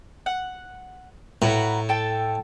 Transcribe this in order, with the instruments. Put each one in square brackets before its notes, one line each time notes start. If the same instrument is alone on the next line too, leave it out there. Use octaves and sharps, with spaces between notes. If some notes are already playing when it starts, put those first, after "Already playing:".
[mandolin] F#5
[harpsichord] A2 [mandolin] F#4 B4 A#5
[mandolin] A4 G5 A5